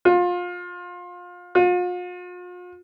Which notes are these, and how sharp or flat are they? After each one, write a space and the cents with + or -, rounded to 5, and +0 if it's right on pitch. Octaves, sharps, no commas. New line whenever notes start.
F4 +25
F4 +40